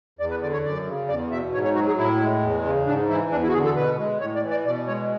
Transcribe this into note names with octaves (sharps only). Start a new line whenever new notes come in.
E2 D5
B4
D3 D5
C#5
F#2 D5
C#3
E2 D5
B2 E5
G#2 C#5
C#5
F#3 F#4
G#4
A2 E4
G#3
E2
C#3
G#2 D4
E3 E4
E2 D4
E4
F#4
D3 G#4
A4
B2 B4
G#3
A2 C#5
D5
E3
D5
B2 D5
G#3 C#5